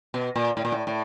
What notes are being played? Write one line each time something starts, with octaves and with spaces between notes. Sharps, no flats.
B2
A#2
A2
A#2
A2
A2